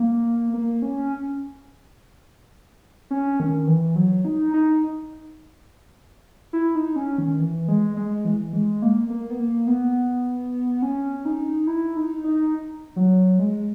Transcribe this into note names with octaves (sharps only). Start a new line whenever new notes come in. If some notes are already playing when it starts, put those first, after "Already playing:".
Already playing: A#3
A#3
C#4
C#4
D#3
E3
F#3
D#4
D#4
E4
D#4
C#4
D#3
E3
G#3
G#3
E3
G#3
A#3
A#3
B3
A#3
B3
C#4
D#4
E4
D#4
D#4
F#3
G#3